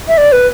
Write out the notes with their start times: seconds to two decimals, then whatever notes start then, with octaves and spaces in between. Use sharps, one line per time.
0.08 E5
0.18 D5
0.32 B4